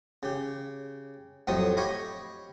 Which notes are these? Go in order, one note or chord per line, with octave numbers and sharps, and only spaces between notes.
C#3 G4
F2 A2 F#3 G3 C4 D#6
G4 C#5 D#5 F5 B5